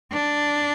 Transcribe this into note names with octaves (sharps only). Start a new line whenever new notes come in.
D4